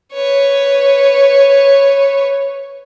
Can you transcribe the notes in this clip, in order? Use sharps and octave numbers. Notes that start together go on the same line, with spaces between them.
B4 C#5